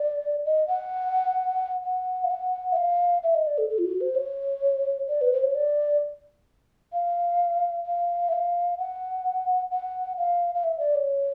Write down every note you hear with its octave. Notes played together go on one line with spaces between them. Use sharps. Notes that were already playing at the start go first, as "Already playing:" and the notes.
Already playing: D5
D#5
F#5
F#5
F5
F#5
E5
F5
E5
D#5
D5
A4
A4
F4
F#4
C5
C#5
D5
B4
C5
C#5
D5
F5
F5
E5
F5
F#5
F#5
F5
F5
E5
D5
C#5